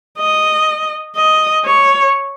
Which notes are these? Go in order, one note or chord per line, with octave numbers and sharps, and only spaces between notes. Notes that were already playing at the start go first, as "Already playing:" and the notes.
D#5
D#5
C#5